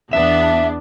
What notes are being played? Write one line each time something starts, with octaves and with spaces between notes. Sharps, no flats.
E2 B3 D4 E5